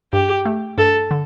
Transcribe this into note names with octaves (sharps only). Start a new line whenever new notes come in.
G2 G4
A3
G2 A4
D3